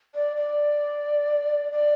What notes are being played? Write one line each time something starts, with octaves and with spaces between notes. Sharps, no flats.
D5
D5
D5